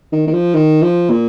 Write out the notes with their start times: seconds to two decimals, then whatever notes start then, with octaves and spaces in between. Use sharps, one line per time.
0.12 D#3
0.27 D#3
0.33 F3
0.54 D#3
0.82 F3
1.10 A#2